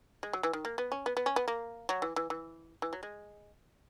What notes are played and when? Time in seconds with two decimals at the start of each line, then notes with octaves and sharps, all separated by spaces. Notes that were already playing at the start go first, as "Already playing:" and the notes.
0.23 G#3
0.33 F#3
0.43 E3
0.53 D#3
0.65 A#3
0.78 B3
0.92 C#4
1.06 B3
1.17 B3
1.26 C#4
1.36 B3
1.48 A#3
1.89 F#3
2.02 E3
2.16 E3
2.30 E3
2.82 E3
2.93 F#3
3.03 G#3